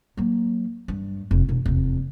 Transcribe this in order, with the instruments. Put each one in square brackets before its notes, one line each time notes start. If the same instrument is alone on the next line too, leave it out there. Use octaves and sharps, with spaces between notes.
[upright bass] F#3 A#3
G2
F1
E1
F1 E2